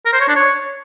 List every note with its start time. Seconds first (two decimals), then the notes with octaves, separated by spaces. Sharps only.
0.06 A#4
0.13 C5
0.21 C#5
0.28 D4
0.36 C#5